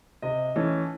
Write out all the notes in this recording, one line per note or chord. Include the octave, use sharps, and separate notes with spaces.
C3 D#5
E3 A3 C#4